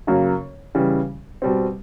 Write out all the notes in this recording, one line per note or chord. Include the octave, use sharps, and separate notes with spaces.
F#2 C#3 F#3 A#3
C#3 E3 G3
B2 G3 C4